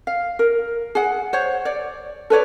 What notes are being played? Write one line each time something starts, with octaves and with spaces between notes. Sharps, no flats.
F5
A#4
G#4 F#5
C5 C#5 F#5
C#5 D5
A4 B4 C#5 D5